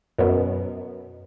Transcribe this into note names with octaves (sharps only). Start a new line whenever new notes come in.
F#2 B2